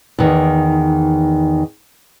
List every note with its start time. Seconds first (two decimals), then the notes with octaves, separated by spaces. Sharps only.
0.19 E2 D#3